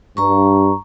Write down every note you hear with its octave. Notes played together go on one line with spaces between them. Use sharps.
G2 A#5 C#6